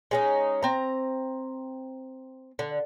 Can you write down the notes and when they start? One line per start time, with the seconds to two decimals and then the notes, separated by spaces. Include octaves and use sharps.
0.11 G#3 C#4 D#4
0.63 C4 A#5
2.59 D3